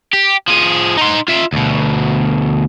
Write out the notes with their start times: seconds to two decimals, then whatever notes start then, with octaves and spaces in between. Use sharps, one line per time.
0.13 G4
0.48 F3 G#4
0.98 D#4 C6
1.28 F4 E5
1.52 D2 B2